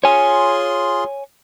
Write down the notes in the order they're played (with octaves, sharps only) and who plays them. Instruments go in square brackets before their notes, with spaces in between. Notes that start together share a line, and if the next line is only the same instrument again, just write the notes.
[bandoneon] F4 G#4 C6 [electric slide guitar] C#5 G#5